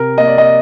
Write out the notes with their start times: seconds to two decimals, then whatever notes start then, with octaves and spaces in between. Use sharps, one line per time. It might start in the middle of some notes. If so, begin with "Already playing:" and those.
Already playing: C3 A#4
0.18 A#3 D#5
0.28 D5
0.38 D#5